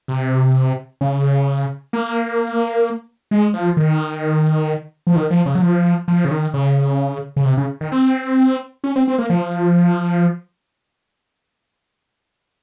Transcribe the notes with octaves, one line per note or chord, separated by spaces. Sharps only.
C3
C#3
A#3
G#3
F3
D#3
F3
D#3
F3
C#3
F#3
F3
F3
C#3
D#3
C#3
C#3
C3
C#3
D#3
C4
C#4
C4
C4
A#3
F3